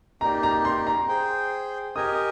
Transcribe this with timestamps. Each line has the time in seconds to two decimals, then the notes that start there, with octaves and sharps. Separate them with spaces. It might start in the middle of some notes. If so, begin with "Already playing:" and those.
0.21 A#3 D#4 G4 D5 A#5
0.43 A#5
0.65 C6
0.87 A#5
1.08 G#4 C5 G5
1.96 G4 A#4 D#5 G#5 D#6